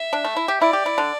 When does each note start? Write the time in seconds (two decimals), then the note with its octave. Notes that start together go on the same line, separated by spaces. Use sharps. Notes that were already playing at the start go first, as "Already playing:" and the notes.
Already playing: E5
0.13 D4
0.25 A3
0.37 E4
0.48 G4
0.61 E4 D5
0.73 G4
0.86 E4
0.98 D3